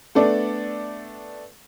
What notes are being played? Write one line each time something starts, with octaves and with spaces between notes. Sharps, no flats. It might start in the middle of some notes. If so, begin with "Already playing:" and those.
A3 B3 D4 A4 D5